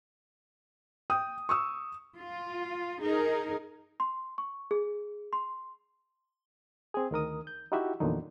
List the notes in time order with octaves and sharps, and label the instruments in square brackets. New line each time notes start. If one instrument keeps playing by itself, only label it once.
[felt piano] G5 D#6
C#6 D#6 E6
[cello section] F4
D#4 G#4 A#4
[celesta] C6
C#6
G#4
C6
[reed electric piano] C4 G#4
D2 D#3 A#4 D#6
G6
D#4 E4 F#4 G4 E5
E2 A#2 D3 D#3 F#3 D#4